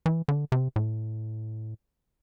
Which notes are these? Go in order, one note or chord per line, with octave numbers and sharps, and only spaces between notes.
E3
D3
C3
A2